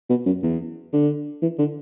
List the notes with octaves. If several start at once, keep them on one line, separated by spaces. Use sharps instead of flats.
B2
F#2
E2
D3
E3
D3